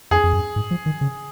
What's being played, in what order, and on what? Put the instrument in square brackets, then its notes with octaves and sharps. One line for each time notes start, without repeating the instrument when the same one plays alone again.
[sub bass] F2 [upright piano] G#4
[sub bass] F2
F#2
G#2
F3
D#3
C#3